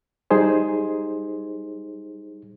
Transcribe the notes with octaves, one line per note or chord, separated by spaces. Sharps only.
G3 D#4 G#4 C5